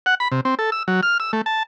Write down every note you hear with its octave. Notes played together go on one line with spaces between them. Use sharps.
F#5
B5
C3
C4
A4
E6
F#3
F6
E6
A3
A5